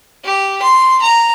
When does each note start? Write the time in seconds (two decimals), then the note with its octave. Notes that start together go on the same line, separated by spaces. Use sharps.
0.24 G4
0.62 C6
1.02 A#5